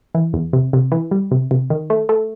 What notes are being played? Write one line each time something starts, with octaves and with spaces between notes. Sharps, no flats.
E3
E2
C3
C3
E3
G3
C3
C3
D#3
A3
A3